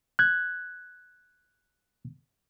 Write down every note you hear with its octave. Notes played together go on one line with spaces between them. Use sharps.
F#6 G#6